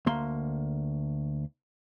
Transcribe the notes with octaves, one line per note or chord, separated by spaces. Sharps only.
D2 A#3 C6